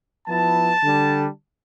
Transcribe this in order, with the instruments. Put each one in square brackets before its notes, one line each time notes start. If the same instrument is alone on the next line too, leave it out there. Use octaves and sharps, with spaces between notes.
[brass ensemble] F3 B3 E4 A5
D3 G3 D4